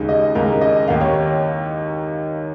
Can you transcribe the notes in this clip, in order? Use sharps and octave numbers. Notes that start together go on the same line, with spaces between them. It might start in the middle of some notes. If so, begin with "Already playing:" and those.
Already playing: D#2 C#3 G#3 D#4
D#5
D#2 C#3 G#3 D#4 A#4
D#5
D#2 D#3 A#3 F5
C#5
C#5